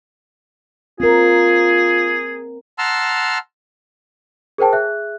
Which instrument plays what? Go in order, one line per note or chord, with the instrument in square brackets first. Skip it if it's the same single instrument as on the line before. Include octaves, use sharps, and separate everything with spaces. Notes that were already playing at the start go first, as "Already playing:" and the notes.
[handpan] C4 A#4 [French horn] F4 [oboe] G#4
[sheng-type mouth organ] F#5 A5 A#5 C6 E6 F6
[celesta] G#4 A#4 C5 G5 A5
G#4 E5 F#6